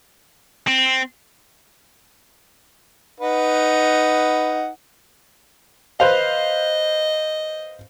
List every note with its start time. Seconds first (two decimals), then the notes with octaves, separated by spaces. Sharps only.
0.67 C4
3.20 D#4 B4 F#5
6.00 B4 C5 D#5 F5